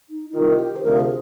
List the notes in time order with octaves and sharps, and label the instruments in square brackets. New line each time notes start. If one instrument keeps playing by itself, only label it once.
[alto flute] D#4
D#4
[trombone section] C2 C3 D#3 [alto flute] F4
[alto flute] G4
C5
[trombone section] D2 C3 F3 [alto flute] A#4
[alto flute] G#4